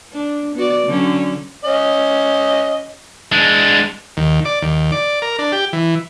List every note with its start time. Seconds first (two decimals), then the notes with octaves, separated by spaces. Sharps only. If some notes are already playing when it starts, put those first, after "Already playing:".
0.12 D4
0.55 B3 F#4 D5
0.86 D3 F#3 C#4
1.65 C#4 D#5
3.32 G#3 D4
4.17 D#2
4.45 D5
4.62 D#2
4.92 D5
5.22 A#4
5.39 D4
5.52 G4
5.73 E3